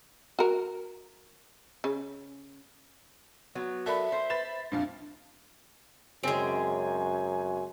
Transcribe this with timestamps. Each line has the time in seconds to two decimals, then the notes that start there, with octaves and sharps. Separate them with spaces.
0.39 F#4 A#4
1.84 C#3
3.55 F#3 B3
3.86 A4 A#4 D5 E5 B5
4.12 C5
4.30 B4 B5 A6 E7
4.72 A#1 F2 D4 F5
6.23 F#2 C#3 G#3 C4 G#4 G#5